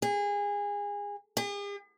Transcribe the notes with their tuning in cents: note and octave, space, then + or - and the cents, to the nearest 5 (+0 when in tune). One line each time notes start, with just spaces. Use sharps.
G#4 -25
G#4 -45